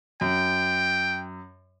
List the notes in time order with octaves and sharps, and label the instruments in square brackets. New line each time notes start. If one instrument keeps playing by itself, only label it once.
[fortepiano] F#2 [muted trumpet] G5